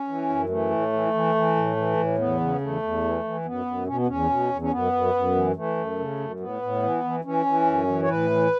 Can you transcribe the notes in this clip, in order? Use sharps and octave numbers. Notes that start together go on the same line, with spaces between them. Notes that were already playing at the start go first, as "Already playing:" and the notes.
Already playing: C#4
E3
F#2
E3 A3
A2
E3
E3
E3
A2
E3
A2
E2 B3
C#3
E2 A3
E2
E3
E3
F#2 B3
F#2
B2 C#4
B3
E2 C#4
B2
E2
C#4
F#2 B3
F#2
F#2
E3
E3 A3
F#2
C#3
F#2
A2 B3
A2
E3
E3
E3 C#4
E3
F#2
E3
C#5
A2 B4
E3